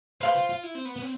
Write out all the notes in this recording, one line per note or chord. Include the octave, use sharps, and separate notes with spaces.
B4 C5 F5 C6
F4
F4
E4
C4
B3
B3
C4